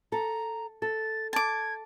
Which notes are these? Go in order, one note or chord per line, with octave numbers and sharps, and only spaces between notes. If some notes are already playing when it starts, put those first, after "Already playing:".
A4 A#5
A4 A6
A5 D6 G#6